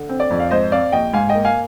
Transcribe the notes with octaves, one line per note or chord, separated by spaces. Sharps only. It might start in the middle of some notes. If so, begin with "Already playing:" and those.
Already playing: D3
C4
D5
F2
F5
G#2 C5 D#5
C4 D5 F5
A#1 D#5 G5
G#2 F5 G#5
D#5 G5
A#3
F5 G#5